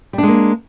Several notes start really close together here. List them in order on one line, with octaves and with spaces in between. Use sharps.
G3 D4 G#3 A#3